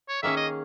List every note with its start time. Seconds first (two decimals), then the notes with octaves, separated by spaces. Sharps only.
0.08 C#5
0.22 D#3 A#3 C#4 G#4 E5
0.37 D#5